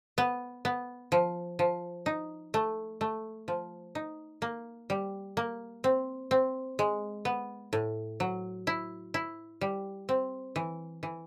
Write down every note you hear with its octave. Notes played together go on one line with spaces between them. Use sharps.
B3
B3
F3
F3
D#4
A3
A3
F3
D#4
A#3
G3
A#3
C4
C4
G#3
B3
A2
F#3
E4
E4
G3
C4
E3
E3